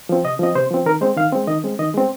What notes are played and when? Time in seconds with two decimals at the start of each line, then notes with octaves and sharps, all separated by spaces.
0.09 F3 C4
0.25 C3 D#5
0.39 F3 C4 D#5
0.55 C3 C5
0.70 F3 C4
0.86 D#3 A#4
1.01 G#3 C4 C5
1.16 D#3 F5
1.32 G#3 C4
1.47 D#3 D#5
1.64 G#3 C4
1.79 D#3 D#5
1.94 G#3 C4